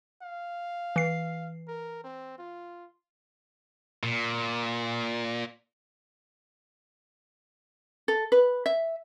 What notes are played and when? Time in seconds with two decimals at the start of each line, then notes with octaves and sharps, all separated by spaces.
0.23 F5
0.96 E3 C7
1.68 A#4
2.04 C4
2.39 F4
4.03 A#2
8.08 A4
8.32 B4
8.66 E5